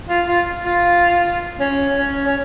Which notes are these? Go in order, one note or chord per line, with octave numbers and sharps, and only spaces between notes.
F4
F4
F4
C#4
C#4
C#4